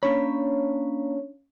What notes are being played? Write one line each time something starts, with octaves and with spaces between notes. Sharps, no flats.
A#3 C#4 D4 C#5 F5 B5